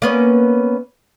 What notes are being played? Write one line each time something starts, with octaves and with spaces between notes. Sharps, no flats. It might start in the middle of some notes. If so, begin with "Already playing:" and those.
A#3 B3 C#4